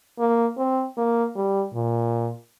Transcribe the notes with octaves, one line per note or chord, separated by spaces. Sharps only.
A#3
C4
A#3
G3
A#2